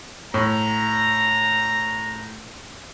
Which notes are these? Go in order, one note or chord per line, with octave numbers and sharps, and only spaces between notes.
A2 A#5